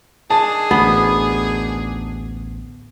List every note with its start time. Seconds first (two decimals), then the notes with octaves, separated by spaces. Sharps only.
0.30 D#3 D4 G#4 A5
0.71 A1 D2 B3